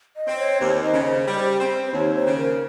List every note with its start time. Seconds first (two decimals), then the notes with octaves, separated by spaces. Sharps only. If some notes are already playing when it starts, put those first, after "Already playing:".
0.17 D#5
0.27 C4
0.38 C#5
0.60 D#2 C5
0.82 D#5
0.93 C#3
1.04 C5
1.27 G3
1.60 C4
1.86 C5
1.93 D#2 C#5
2.15 C5
2.27 C#3
2.38 A#4